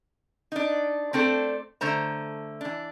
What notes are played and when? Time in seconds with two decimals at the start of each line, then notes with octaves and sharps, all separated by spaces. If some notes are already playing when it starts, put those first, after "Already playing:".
0.52 D4 D#4
1.13 A3 C4 D4 A4
1.81 D3 A3 C5 A#5
2.61 E3 D4